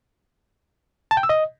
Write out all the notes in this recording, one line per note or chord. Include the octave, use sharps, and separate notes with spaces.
A5
G5
E6
D#5